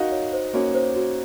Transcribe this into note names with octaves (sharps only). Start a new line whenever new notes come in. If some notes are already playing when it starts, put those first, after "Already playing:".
Already playing: D#4 F#4 A#4 F5
C#5
C5
A#3 C#4 F#4
C5
F#4